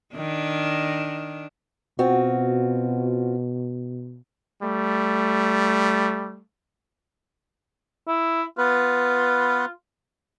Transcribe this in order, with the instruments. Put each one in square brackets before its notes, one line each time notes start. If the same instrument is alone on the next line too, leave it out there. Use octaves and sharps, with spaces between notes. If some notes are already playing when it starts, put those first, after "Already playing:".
[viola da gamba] D#3 D4
[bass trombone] B2 [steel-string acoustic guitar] C4 F4 F#4
[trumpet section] G3 A3
[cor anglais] E4
[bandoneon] B3 B4 [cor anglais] F4